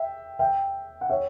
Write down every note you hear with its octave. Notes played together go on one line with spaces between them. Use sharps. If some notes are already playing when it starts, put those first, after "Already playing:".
Already playing: E5 G5
E5 G5
F#5
C#5 E5